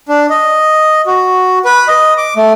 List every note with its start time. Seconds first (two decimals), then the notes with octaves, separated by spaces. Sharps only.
0.09 D4
0.30 D#5
1.06 F#4
1.65 B4
1.88 D#5
2.17 D6
2.36 A3